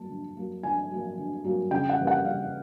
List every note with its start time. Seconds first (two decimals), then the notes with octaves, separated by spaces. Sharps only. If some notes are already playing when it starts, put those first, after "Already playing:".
Already playing: F#3 A#3 A5
0.10 D3
0.37 F#3 A#3
0.63 D3 G#5
0.91 F#3 A#3
1.17 D3
1.44 F#3 A#3
1.71 C#3 G5
1.89 F#5
1.99 E3 G3 A#3
2.07 F#5
2.25 C#3 F5